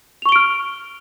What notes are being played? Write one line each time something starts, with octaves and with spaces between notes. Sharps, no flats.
C#6 F6 D7 F7 G7